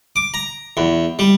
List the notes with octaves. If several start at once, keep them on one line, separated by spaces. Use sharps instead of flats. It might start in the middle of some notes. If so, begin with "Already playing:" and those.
D6
A#5
E2
G3